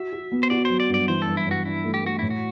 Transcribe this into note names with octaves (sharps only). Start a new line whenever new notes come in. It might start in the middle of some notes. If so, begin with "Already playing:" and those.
Already playing: F#4 E5
F#4
B3
C5
F#4 D5
F#3 C5
D5
G2
D5
E3 C5
A4
G2
E4
G2 F#4
D4 E4
A3
G4
A3 F#4
A2 E4
F#4